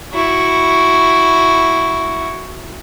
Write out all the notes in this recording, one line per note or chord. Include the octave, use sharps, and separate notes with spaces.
E4 F#4